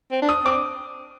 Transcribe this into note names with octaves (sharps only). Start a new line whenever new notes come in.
C4
D4
D#6
C4 D6